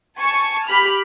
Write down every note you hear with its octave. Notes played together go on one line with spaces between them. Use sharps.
G#5 A5 C#6
G4 B5 F6